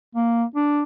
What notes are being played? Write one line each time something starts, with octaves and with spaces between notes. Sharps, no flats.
A#3
D4